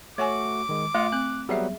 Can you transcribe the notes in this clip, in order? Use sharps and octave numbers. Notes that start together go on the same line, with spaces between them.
A3 F#4 C#5 G#5 D6
D#3 G#3
A3 F4 D#5 F#5
C4 F#6
F#3 G3 B3 G#4 E5